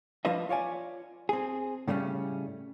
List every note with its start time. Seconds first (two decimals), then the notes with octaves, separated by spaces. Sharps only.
0.25 F3 D4 F4 B4 D#5 E5
0.49 F4 C#5 D5 G#5
1.29 C4 G#4
1.88 A2 C#3 G3 A3 B3 C#4